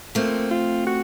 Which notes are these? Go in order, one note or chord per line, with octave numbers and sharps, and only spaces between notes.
F3 A3 A#3 C4
F4
F#4